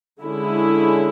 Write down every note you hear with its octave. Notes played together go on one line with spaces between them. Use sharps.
D3 G#3 C#4 E4